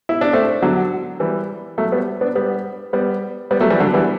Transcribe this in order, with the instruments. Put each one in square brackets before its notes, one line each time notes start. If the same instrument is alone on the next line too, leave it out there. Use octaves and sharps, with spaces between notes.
[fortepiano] E4
D4
A3 C4
D3 F#3
E3 G3
F#3 A3
G3 B3
B3 D4
G3 B3
G3 B3
G3 B3
F#3 A3
E3 G3
D3 F#3
E3 G3